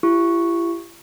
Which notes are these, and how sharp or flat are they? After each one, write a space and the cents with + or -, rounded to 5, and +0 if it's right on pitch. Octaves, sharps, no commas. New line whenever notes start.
E4 +40 G4 +0 C#6 +0